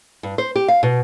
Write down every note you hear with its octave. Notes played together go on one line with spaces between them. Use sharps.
G2
C5
G4
F5
B2